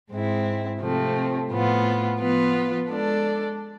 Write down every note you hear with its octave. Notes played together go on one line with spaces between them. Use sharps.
G#2 G#3 C4 E4
C3 F3 A3 C4
A2 F3 B3 F4
F3 B3 F4 B4
G#3 D4 A4 D5